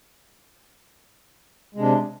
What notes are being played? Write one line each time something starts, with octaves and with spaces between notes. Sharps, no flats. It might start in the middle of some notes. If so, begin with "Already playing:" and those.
C3 G#3 D4